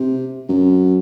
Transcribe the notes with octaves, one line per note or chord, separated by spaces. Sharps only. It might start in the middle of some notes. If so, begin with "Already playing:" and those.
Already playing: C3
F#2